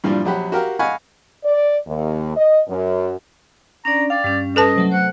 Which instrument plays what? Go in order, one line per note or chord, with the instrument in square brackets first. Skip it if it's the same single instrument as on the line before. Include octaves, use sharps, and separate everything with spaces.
[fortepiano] G2 A#2 E3 F3 G3
A#1 F#3 G4 F#5 B5
F#4 G4 A#4 F5
D#5 F5 F#5 G#5 B5 C#6
[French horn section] D5
D#2
D#5
F#2
[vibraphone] C#4 D4 D5 [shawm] A#5
[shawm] D5 [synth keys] F5 [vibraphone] G5
[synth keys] G2 [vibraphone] G3 C#4
[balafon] A4 B4 A5 [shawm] D#5
[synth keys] C3 F#3 A3
[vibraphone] C5 [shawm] F#5